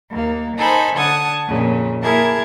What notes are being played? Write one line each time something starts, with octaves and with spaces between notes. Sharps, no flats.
D#2 A#3
D#4 A4 C5 G#5 B5
D3 F#5 A5 D#6 G#6
F2 A#2 C#3
A#3 E4 G#4 A#4 A5 G#6